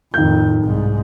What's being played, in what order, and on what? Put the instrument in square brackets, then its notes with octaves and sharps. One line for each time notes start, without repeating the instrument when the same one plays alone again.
[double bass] F2 A2 [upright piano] D#3 G6
[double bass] C2 G#2